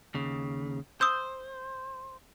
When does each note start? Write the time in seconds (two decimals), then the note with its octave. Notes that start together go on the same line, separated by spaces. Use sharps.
0.14 D#2 C#3
1.01 C5 D#6 E6 G6